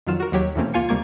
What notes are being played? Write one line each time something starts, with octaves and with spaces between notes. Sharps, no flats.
F2 D#3 F#3 F4 F6 E7
F#4 A#4
D#2 F#3 G4 C#5
E2 B2 A3 A#3 C4 C#4
C#2 A#3 F4 F5 G#5 C#7
D2 C3 G3 A#3 C#6 G#6